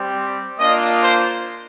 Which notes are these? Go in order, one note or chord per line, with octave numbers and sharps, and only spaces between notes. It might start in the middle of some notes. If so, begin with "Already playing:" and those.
Already playing: G3 C4 G4
A#3 D4 F4 D#5
C5